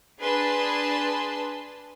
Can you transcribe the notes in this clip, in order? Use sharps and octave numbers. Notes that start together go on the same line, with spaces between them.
D4 G#4 B4 A5 C6